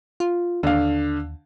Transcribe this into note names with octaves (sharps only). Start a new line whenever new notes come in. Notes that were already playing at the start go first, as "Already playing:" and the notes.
F4
D#2 D3 F5